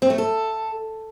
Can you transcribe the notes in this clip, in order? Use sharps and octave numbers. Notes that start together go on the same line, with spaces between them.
C4
A3
A4